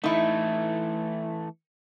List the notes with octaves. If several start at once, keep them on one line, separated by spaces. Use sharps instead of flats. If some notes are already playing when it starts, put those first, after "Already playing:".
E3 A3 D#4 E4